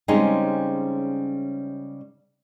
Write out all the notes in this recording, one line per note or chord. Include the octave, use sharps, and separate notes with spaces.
C#3 G3 G#3 C4 C#4 D#4